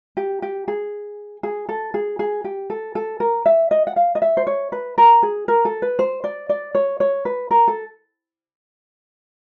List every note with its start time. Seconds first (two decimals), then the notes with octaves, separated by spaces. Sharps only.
0.17 G4
0.42 G4
0.68 G#4
1.43 G#4
1.69 A4
1.94 G#4
2.19 G#4
2.44 G4
2.70 A4
2.95 A4
3.20 A#4
3.46 E5
3.71 D#5
3.87 F#5
3.96 F5
4.15 D#5
4.22 E5
4.37 C5
4.47 C#5
4.72 B4
4.98 A#4
5.23 G#4
5.48 A#4
5.65 A4
5.82 B4
5.99 C5
6.24 D5
6.49 D5
6.75 C#5
7.00 C#5
7.25 B4
7.51 A#4
7.68 A4